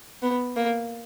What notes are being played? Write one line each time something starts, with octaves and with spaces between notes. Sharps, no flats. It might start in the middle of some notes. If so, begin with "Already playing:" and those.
B3
A#3